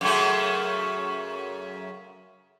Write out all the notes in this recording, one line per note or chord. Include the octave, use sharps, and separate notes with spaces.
F#2 C#3 A3